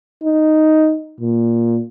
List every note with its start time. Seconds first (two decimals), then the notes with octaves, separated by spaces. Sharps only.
0.23 D#4
1.20 A#2